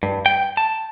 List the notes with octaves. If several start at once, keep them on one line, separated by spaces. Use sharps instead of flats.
G2
G5
A5